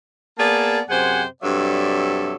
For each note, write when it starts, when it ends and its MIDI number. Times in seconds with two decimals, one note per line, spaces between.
0.39 0.80 58
0.39 0.80 59
0.39 0.80 68
0.39 0.80 74
0.39 0.80 81
0.89 1.23 42
0.89 1.23 48
0.89 1.23 68
0.89 1.23 72
0.89 1.23 78
0.89 1.23 80
1.42 2.36 43
1.42 2.36 48
1.42 2.36 54
1.42 2.36 69
1.42 2.36 74
1.42 2.36 76